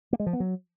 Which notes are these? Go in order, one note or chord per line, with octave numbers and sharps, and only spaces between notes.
A#3
G#3
F3
B3
F#3